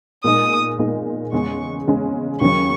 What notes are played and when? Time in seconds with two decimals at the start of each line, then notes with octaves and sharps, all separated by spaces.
0.24 A#2 G#3 D#4 D#6
0.79 A#2 G#3 D#4
1.32 E2 C#3 G#3 C#4 C#6
1.87 E2 C#3 G#3 C#4
2.41 D#2 C#3 F#3 C#4 C#6